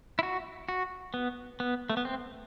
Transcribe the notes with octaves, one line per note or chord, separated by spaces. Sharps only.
E4
F#4
F#4
B3
B3
A3
B3
C4